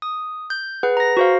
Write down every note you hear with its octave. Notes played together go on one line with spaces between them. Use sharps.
D#6
G6
G#4 B4 F#5
A#5 A#6
F#4 C5 F5